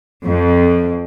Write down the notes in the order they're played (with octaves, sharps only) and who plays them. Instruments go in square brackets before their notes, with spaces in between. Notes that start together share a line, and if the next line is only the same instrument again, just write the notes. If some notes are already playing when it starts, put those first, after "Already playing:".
[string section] F2